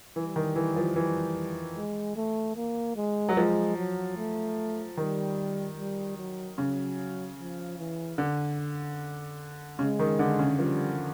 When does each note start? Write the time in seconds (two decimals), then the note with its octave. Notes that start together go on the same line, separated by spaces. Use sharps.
0.16 E3 G3
0.36 D#3
0.56 E3
0.76 F3
0.96 E3
1.76 G#3
2.16 A3
2.56 A#3
2.96 G#3
3.29 F#3
3.37 F3 G#3
3.77 F#3
4.17 A3
4.97 D#3 G3
5.78 G3
6.17 F#3
6.58 C#3 F#3
7.39 F3
7.78 E3
8.18 D3
9.79 C#3 G#3
9.99 D#3
10.19 D3
10.39 C#3
10.59 F3 G3